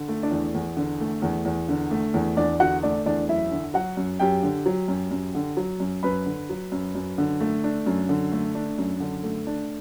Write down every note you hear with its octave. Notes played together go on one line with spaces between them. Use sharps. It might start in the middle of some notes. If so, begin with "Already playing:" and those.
Already playing: D3
A3
D4 D5
E2
E2
D3
A3
E2
E2
D3
A3
E2
E2 D4 D5
D3 F#4 F#5
A3 D4 D5
E2 D4 D5
F#2 E4 E5
D3
F#3 F#4 F#5
F#2
F#2 G4 G5
D3
F#3
F#2
F#2
D3
F#3
F#2
F#2 B4 B5
D3
F#3
F#2
F#2
D3
A3
D4
F#2
D3
A3
D4
F#2
D3
A3
D4